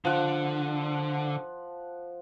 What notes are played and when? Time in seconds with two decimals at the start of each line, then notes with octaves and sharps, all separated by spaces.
0.05 D3 F3 F#5